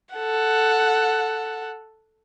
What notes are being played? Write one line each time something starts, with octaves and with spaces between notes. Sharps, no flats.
A4 F#5